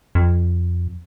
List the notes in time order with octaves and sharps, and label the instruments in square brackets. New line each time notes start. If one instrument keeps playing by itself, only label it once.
[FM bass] F2